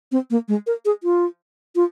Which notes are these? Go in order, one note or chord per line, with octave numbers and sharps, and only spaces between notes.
C4
A#3
G#3
A#4
G#4
F4
F4